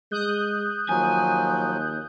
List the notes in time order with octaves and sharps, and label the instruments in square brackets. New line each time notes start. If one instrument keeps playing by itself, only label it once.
[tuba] G#3 [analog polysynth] D#6 F#6 G6
[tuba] D#2 [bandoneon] F3 F#3 [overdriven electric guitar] G#5